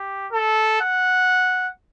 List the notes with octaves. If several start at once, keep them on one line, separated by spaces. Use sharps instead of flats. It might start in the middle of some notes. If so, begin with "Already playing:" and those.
Already playing: G4
A4
F#5